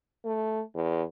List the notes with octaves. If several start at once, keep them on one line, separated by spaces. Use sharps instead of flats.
A3
E2